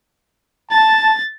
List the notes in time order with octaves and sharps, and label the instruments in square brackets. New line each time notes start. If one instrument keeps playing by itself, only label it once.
[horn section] A5 [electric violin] A6